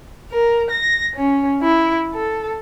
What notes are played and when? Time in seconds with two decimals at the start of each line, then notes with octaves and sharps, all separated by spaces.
0.30 A#4
0.68 A#6
1.15 C#4
1.62 E4
2.14 A4